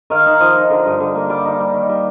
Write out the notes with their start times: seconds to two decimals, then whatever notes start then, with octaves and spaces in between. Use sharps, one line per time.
0.10 D#3 F5
0.26 D#4
0.40 F3 D#5
0.55 D#4
0.70 D3
0.85 G2
1.00 D3
1.15 A#3
1.29 G3 D5
1.45 D#4
1.60 G3
1.74 D#3
1.89 G3